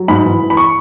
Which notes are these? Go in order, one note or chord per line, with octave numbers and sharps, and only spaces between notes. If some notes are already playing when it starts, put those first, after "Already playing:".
Already playing: F#3
G#2 B5
E3
E3
B5
C#6